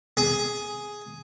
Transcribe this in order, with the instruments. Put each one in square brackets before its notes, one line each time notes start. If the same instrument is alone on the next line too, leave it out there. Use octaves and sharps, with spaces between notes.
[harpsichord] G#4